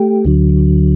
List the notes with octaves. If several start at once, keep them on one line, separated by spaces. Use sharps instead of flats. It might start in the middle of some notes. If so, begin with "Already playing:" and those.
Already playing: A3 G4
D2 D3 F#3